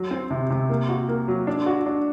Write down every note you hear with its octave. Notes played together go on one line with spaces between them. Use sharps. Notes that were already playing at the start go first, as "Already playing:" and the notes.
Already playing: F#3
C4
C3
C3
A#3
F#4
A#3
F#3
D4
F#4
D4